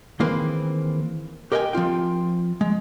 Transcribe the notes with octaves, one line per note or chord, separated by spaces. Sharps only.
D#3 E3 A#3 C4 G#4 B4
G4 A#4 D#5 F5 G5 G#5
F3 C4 F4 G5
G#3